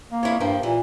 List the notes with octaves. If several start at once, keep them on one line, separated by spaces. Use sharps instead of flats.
A#3
F2 E4 C#5
G2 F3 A#3 G4
A#2 E3